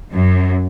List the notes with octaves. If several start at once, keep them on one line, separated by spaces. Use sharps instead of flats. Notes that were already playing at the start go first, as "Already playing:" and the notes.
F#2